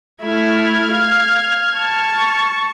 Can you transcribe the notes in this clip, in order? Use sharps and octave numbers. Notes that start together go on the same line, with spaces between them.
A3 E4 F6 G#6
F5
A5 C#6